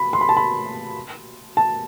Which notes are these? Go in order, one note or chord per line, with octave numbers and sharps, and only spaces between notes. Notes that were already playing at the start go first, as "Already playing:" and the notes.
Already playing: B5
C6
B5
A5
B5
A5